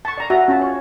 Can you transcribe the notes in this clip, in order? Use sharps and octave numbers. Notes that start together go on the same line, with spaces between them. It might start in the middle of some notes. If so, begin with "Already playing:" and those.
A5 C#6
D5 A#5
F#4 E5 A#5
C#4 F4 A5
C#5